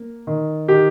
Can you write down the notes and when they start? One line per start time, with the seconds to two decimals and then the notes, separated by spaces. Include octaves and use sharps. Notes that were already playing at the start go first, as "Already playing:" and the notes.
Already playing: A#3
0.27 D#3
0.68 D#3 G4